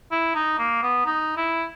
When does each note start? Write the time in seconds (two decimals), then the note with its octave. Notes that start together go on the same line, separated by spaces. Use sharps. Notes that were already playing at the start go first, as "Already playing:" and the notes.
0.11 E4
0.34 D#4
0.58 A#3
0.83 B3
1.06 D#4
1.37 E4